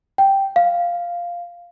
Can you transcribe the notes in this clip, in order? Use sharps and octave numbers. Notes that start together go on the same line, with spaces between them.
G5
F5